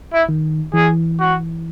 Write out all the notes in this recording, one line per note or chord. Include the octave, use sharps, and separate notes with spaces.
E4
D#3
E3 G#4
F#4